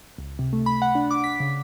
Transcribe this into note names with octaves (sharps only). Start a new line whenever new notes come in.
C#2
C3
A3
B5
F#5
D4
D6
B6
C#3